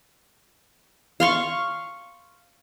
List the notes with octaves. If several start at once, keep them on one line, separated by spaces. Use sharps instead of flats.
F5 C6 C#6